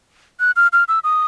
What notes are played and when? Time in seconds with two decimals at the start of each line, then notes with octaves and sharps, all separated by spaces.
0.40 F#6
0.56 F6
0.73 F6
0.88 E6
1.04 D#6